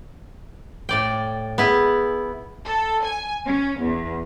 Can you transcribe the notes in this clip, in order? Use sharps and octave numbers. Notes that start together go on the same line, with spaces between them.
A2 D5 G5
B3 E4 G#4 B4
A4
G#5
C#4
E2